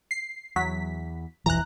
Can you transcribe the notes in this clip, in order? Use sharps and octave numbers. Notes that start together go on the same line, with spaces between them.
C7
E2 F#3 B6
D#1 B1 F2 E3 A#5 F#6